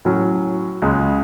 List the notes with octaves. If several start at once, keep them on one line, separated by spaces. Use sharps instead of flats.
A2 F#3 C#4
C#2 C#3 G#3